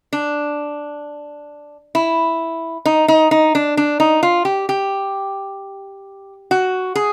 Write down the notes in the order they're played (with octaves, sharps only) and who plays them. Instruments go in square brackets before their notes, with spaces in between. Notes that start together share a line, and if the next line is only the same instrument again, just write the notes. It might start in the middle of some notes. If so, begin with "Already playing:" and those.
[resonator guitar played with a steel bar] D4
E4
D#4
D#4
D#4
D4
D4
D#4
F4
G4
G4
F#4
G#4